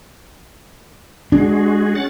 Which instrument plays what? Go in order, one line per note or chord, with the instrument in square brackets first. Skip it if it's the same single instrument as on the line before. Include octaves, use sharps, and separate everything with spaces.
[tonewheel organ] G#3 F#4 G#4 [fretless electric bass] D4
[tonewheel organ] C#4 F#5 A6